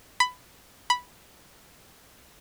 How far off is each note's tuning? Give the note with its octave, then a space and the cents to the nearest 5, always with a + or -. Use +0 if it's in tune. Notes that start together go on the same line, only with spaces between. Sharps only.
B5 +15
B5 -5